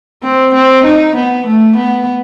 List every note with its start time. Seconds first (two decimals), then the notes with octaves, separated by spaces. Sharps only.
0.23 C4
0.54 C4
0.84 D#4
1.15 B3
1.46 A3
1.76 B3